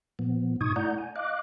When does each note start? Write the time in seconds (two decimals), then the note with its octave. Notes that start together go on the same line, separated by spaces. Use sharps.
0.19 A#2 F3 B3
0.61 G#2 B2 D#4 C#6 D#6 G#6
0.76 A3 E4 D5 F#5 A#5 G6
0.98 G#5
1.16 D#5 F5 D6 F#6